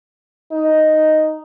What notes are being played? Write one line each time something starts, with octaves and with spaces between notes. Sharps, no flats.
D#4